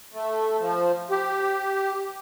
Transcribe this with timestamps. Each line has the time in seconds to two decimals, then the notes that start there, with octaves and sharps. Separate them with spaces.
0.14 A3
0.60 F3
1.10 G4